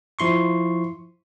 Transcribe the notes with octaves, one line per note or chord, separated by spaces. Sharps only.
F3 E4 C6 C#6